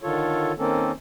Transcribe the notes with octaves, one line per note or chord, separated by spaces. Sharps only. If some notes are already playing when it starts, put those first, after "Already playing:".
D3 D#3 F4 A4 C#5
D#3 A#3 C4 C#4 A4